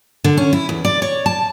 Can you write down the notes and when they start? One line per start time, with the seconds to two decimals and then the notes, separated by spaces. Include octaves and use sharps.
0.24 D3
0.37 C#4
0.53 E4
0.69 E2
0.85 D5
1.02 C#5
1.26 A5